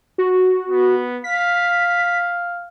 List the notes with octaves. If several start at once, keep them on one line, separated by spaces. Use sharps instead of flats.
F#4
B3
F5 B6